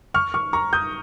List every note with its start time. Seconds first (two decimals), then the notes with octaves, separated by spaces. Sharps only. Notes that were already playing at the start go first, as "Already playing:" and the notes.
0.14 C#6 F6
0.34 C#6 F6
0.53 A#5 C#6
0.73 D#6 G6